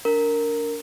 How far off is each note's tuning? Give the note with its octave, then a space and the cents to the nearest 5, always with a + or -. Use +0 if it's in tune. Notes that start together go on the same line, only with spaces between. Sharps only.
D4 -35 A#4 -10